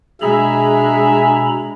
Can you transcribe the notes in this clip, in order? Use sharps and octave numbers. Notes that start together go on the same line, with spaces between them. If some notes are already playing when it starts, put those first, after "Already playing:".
B2 G#3 D4 G#4 E5 A#5 B5